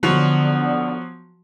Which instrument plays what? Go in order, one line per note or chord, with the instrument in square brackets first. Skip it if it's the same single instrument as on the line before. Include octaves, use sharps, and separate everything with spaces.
[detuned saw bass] D3 [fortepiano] F3 F#3 F#4 [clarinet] B3